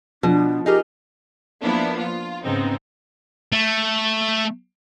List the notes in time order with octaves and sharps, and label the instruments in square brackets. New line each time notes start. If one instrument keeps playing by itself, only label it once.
[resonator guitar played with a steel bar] B2 [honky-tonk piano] F3 [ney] D4
[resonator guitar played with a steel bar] D#4 G#4 A#4 [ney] G4
[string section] F3 A#3 B3 D4 E4
F4
G#2 C#3 G#3 B3 C4 D#4
[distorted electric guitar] A3